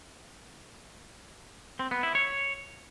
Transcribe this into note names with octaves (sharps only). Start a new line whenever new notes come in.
C4
B3
E4
C#5